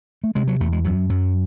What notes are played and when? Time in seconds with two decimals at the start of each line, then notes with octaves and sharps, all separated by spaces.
0.24 A3
0.35 C3 G#3
0.48 F#3
0.60 E2 A3
0.72 G#3
0.84 F#2 F#3
1.10 F#2 F#3